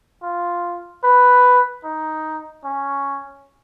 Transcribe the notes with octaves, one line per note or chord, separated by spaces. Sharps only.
F4
B4
D#4
C#4